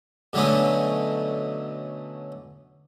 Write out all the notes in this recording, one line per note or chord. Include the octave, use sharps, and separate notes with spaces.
B2 D3 F#3 A3 B3 C#4